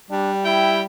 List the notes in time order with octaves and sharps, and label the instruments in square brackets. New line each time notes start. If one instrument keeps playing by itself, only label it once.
[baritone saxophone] G3 [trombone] D4
[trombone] E4 [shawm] G5